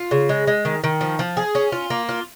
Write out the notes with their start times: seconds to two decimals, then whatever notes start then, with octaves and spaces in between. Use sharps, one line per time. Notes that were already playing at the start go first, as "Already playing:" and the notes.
Already playing: F4
0.11 C#3
0.29 G#3
0.47 G#3
0.65 D#3
0.84 D#3
1.01 F3
1.19 F3
1.37 G#4
1.55 C#4
1.72 F4
1.90 A#3
2.09 F4